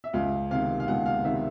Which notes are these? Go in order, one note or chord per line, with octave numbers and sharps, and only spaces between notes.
E5
C#2 F5
C3 D#3 F5
F5
C#2 F#5
F5
C3 D#3 E5